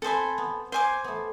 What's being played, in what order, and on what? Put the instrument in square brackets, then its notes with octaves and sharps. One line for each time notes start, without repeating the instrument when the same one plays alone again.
[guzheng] C4 [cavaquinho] A4 C5 G#5 B5
[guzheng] B3
[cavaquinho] C5 G#5 D6
[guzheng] A3 B3